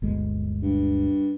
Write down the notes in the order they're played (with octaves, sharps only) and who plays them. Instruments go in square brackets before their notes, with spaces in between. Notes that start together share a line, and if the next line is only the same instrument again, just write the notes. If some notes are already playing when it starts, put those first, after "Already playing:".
[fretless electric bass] G1 D2 G#3
[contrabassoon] G2